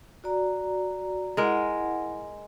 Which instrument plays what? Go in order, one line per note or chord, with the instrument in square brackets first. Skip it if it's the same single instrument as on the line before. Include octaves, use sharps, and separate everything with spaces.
[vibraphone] F#4 D5 A#5
[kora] G#3 A#4 [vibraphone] E4 F#5